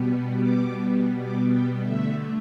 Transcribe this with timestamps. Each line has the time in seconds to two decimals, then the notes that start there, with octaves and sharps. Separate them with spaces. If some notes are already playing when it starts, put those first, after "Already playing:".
Already playing: B2 G3 B3
0.39 D6
0.68 B2 G3 B3
1.24 D6
1.53 G5
1.82 D3 A3 E5